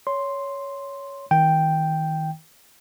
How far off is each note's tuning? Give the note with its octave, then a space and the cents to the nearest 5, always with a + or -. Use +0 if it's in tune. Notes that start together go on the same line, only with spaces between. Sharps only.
C#5 +10 C6 +0
D#3 +30 G5 +0